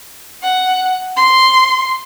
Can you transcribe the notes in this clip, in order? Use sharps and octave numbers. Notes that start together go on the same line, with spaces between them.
F#5
C6